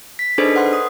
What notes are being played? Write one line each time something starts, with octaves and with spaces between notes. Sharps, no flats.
B6
D4 D#4 G#4 A4 B4 C5
B4 F#5 C6
D#6